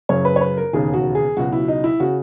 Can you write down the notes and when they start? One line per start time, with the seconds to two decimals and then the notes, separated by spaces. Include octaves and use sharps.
0.09 F#1 F#2 C#3 C#5
0.25 B4
0.36 C#5
0.41 B4
0.57 A#4
0.73 E1 D#2 C#3 G#4
0.94 F#4
1.15 G#4
1.37 C#2 B2 F#3 F#4
1.52 E4
1.68 D#4
1.84 E4
2.00 C#3 F#4